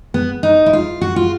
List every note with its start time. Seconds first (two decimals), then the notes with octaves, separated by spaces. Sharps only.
0.14 B3
0.43 D#4
0.66 E4
0.73 F4
1.01 F#4
1.16 F4